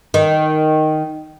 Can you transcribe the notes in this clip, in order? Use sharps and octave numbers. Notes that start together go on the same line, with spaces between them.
D#3